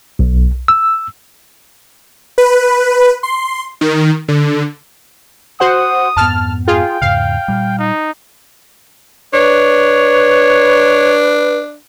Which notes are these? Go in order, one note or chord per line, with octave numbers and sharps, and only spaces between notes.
B1
E6
B4
C6
D#3
D3
F#4 C5 F#5 D#6
F2 G#2 B3 A5 F6
F4 G#4 G5
E2 G#2 C#3 F5
A#2 G3
D#4
D4 B4 C#5